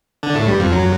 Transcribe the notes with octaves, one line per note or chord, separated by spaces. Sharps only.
D3 D4
A2 A3
G2 G3
F2 F3
F#2 F#3